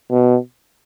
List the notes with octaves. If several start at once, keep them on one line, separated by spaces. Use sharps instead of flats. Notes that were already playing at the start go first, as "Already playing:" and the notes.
B2